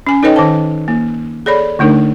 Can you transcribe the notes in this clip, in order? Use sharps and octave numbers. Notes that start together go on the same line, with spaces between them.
C#4 G#5
D#4 A4 B4 C#5 D#5 G5
D#3 C5 A5
A#3
G#4 A4 C#5 D5 B5
D3 A3 D4 D#4 A#4